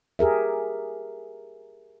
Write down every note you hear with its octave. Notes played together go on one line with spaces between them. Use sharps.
G4 G#4 A#4 E5